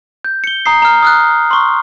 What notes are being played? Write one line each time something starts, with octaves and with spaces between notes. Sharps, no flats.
G6
C#7 G7
A#5 D#6 C7
A#5 F6
D#6 F6 F#6
C6 C#6